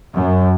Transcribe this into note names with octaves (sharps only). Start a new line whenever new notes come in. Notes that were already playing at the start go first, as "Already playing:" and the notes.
F#2